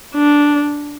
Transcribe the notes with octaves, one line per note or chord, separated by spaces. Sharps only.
D4